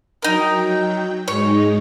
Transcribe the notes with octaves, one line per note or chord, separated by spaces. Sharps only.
F#3 D#4 A#4 G5
G#2 G#3 D#4 C#5